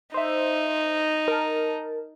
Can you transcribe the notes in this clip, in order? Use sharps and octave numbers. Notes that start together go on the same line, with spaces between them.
D#4 C5 E5
A#4 A5